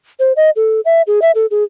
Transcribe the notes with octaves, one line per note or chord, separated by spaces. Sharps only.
C5
D#5
A4
E5
G#4
E5
A4
G#4